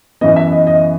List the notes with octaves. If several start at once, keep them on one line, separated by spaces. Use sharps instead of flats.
F#2 E3 B3 D#5
E5
D#5
D#5